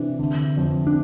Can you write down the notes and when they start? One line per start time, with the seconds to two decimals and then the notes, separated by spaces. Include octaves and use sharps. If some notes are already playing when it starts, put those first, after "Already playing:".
Already playing: C3 E3 D4
0.19 D3
0.57 F2
0.87 D4